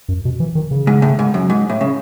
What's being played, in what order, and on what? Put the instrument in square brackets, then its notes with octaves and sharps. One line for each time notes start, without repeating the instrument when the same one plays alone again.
[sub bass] F#2
B2
E3
D#3
C#3
[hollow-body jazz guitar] G#2
A2
G#2
F#2
G#2
A2
C#3